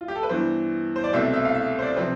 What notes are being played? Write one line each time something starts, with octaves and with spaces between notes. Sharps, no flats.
F4
G4
A4
B4
G2 E3 B3 C5
C5
D5
C2 B2 A3 C4 E5
E5
F5
E5
C5
D5
C3 F3 C4 B4